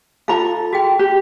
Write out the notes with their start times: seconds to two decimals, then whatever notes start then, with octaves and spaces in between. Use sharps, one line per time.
0.28 F4 A4 F5 A#5
0.73 F#4 G#4 G5
0.99 G4